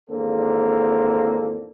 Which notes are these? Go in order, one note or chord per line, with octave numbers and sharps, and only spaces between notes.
G#1 E2 A#3 C4 D4 A4